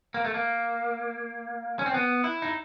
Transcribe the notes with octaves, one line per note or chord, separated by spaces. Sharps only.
A#3
A3
A#3
C#4
C4
B3
E4
D#4